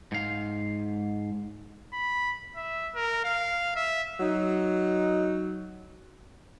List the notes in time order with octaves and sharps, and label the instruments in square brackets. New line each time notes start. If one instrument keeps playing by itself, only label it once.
[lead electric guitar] G#2 F5
[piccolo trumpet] B5
E5
A#4
F5
E5
[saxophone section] F#3 D#4